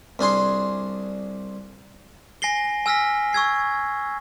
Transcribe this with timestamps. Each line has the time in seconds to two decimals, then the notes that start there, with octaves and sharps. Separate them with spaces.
0.19 C2 D4 G#4 C6
2.42 G#5 A#6 C7 G7
2.86 G#5 E6 F6 A#6 B6
3.33 C#6 E6 G#6 C7